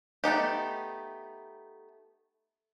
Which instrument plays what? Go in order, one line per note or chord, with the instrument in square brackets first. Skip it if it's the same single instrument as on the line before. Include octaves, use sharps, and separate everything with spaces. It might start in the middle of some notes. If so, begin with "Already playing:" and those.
[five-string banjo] A3 B3 D#4 G4